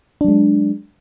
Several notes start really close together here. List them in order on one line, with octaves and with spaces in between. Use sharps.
D4 F#3 G#3